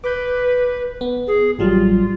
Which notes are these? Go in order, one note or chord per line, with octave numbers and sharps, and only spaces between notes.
B4 D6 G6
B3
G#4
A1 F#3 G3 F4